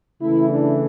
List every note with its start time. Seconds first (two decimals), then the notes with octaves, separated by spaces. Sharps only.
0.21 C#3 E3 A3 E4
0.50 D4